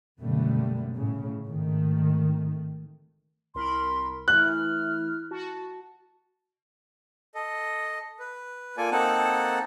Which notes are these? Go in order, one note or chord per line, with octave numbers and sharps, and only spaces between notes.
F#1 B2 D3 G3 A3
A2 C#3
G#1 D#3 A3
C2 A#4 B5 C6
E3 A3 E4 F6 F#6
F#4 A5
A4 D#5
B4
A#3 F4 A4 D5 G#5
A#3 C4 D#4 A4 F#5 A5